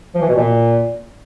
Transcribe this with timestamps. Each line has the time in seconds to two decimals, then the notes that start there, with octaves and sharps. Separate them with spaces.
0.15 F3
0.22 E3
0.29 B2
0.35 A#2